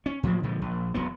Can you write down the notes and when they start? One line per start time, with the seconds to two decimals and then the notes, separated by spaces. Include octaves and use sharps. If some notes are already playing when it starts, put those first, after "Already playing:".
0.06 C#4
0.23 A2 F3 F#3 A#3
0.43 A#2 D3 F3 G#3
0.62 A#1
0.94 E1 E2 F#3 B3